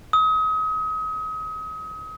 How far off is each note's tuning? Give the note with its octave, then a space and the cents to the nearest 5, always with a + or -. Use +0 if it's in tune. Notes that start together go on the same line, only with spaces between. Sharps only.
D#6 +35